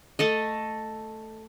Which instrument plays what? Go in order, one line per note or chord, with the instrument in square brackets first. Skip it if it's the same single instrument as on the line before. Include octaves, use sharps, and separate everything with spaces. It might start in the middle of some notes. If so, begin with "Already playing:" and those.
[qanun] A3 A4 D#5